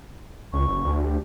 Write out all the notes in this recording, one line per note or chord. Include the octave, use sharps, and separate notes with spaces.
C#2 C#6
F#1
D2
G4